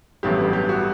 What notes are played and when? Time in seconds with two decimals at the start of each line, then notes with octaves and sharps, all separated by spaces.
0.23 A1 G2 F#3 B3 G4
0.38 G4
0.53 G4
0.69 F#4